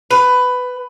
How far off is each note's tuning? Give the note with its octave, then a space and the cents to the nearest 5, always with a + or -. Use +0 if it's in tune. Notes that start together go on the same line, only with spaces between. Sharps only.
B4 +15